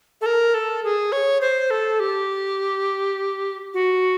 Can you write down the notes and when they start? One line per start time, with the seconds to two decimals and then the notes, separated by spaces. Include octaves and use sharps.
0.21 A4
0.26 A#4
0.54 A4
0.84 G#4
1.12 C#5
1.41 C5
1.71 A4
2.00 G4
3.74 F#4